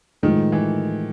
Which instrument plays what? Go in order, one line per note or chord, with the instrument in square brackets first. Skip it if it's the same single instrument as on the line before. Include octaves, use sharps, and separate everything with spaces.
[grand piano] A2 F3 G#3 [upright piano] D#3
[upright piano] E3